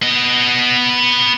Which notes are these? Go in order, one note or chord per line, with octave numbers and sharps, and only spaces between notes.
B3 D#5